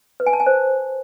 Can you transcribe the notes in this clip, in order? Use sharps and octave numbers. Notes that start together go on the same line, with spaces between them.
B4
G#5
A5
G#5
C5